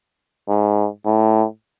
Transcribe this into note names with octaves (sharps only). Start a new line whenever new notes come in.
G#2
A2